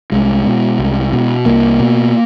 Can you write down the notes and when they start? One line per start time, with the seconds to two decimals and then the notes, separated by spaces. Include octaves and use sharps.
0.12 C2 G#3
0.46 B2
0.79 C2
1.13 B2
1.46 C2 A#3
1.79 B2